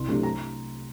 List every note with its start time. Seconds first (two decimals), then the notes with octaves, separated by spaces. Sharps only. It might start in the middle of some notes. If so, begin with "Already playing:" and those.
Already playing: C2 C6
0.08 C3 F#3 A3 D4
0.23 A#5